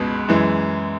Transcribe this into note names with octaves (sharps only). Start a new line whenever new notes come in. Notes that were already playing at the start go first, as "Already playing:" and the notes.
Already playing: C#2 B2 G#3 B4
F#2 E3 G#3